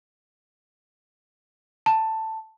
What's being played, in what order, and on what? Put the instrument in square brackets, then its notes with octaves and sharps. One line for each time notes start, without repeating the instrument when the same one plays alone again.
[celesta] A5